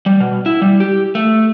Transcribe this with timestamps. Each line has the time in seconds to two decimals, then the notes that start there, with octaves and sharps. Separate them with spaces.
0.06 G3
0.20 B2
0.46 E4
0.62 G3
0.80 G4
1.15 A3